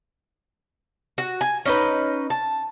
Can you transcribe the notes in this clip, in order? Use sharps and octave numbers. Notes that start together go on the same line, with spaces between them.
F#4
G#5
C#4 D#4 B4
A5